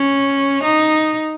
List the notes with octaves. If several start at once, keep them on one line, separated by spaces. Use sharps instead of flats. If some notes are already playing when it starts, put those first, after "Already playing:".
Already playing: C#4
D#4